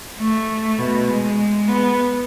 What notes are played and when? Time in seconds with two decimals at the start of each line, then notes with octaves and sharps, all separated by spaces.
0.18 A3
0.78 B2
1.08 G#3
1.68 B3